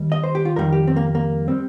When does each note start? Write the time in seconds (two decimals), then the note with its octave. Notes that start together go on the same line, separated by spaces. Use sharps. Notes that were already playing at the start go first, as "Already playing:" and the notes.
Already playing: D#2 D#3 G3
0.12 D#5
0.24 C5
0.35 G4
0.45 F4
0.56 F2 D#3 G3 A#4
0.72 G4
0.87 C4
0.96 A#3
1.15 A#3
1.48 G3 C4